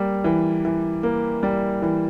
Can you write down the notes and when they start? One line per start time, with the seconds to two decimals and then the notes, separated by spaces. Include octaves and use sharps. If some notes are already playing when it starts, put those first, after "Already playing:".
Already playing: G3 A#3
0.24 E3
0.65 E3
1.03 A#3
1.43 G3
1.82 E3